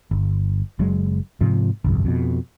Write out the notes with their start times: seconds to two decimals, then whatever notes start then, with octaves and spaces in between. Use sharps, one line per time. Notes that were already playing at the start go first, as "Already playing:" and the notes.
0.11 G1
0.79 F#1 F#3 G#3
1.41 G#2 C3 F3
1.84 G1 C2 F2
2.05 F2 B2